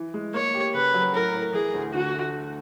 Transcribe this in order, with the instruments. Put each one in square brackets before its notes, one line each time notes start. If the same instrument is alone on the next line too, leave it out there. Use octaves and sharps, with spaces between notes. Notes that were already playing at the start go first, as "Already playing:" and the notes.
Already playing: [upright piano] E3
G#3
[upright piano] A#3 [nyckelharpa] C#5
[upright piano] G4
[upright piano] C#3 [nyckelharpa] B4
[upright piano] F#3
[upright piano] A2 [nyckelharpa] A#4
[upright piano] A2
[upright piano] E3 [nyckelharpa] G#4
[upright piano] D2
[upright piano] D3 [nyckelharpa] F#4
[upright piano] A3